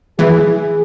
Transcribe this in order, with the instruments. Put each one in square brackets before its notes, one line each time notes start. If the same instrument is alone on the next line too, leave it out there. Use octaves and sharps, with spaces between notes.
[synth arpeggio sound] E3 [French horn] G#4